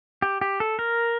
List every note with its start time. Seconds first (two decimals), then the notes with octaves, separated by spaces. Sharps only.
0.22 G4
0.41 G4
0.60 A4
0.79 A#4